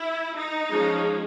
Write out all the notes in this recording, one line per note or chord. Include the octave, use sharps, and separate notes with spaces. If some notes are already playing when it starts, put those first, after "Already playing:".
Already playing: E4
D#4
F3 G#3 C#4